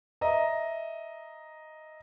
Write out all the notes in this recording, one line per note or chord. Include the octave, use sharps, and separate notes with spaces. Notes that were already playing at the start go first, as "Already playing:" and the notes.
D#5 E5 A#5